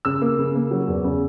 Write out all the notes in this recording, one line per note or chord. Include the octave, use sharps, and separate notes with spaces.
C#3 E6
A#3
C#3
A#3
F#3
E2
C#3